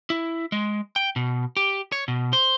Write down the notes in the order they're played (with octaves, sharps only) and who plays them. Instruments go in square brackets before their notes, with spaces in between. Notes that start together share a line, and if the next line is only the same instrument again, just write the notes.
[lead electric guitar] E4
G#3
G5
B2
G4
C#5
B2
C5